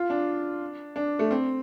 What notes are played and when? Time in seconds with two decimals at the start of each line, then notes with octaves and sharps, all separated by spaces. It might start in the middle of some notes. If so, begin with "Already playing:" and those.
Already playing: F4
0.10 D4
0.96 D4
1.19 A3
1.31 C4